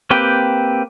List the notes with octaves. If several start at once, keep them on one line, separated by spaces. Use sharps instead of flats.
A#3 C4 G4 B4 G5